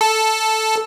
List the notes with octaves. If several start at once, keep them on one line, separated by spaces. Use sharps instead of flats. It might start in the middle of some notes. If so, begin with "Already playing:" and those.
A4